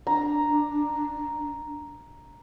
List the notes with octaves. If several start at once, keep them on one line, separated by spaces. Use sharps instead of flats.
D4 A#5